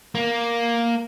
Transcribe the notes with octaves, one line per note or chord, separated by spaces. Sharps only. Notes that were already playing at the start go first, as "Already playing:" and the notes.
A#3